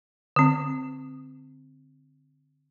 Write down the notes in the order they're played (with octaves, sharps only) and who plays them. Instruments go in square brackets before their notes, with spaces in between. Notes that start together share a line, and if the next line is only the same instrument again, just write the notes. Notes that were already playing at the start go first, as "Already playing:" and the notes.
[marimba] D3 C4